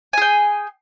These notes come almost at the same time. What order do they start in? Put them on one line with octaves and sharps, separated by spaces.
G#5 G#4 G5